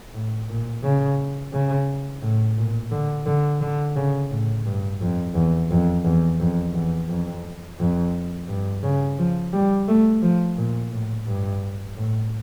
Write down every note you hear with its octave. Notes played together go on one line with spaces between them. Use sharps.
A2
A#2
C#3
C#3
A2
A#2
D3
D3
D3
C#3
A2
G2
F2
E2
F2
E2
F2
E2
F2
F2
G2
C#3
F3
G3
A3
F3
A#2
A2
G2
A2